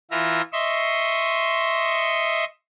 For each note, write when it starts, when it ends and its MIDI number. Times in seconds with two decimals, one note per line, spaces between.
0.11 0.42 52
0.11 0.42 65
0.11 0.42 76
0.11 0.42 82
0.52 2.45 75
0.52 2.45 76
0.52 2.45 84
0.52 2.45 85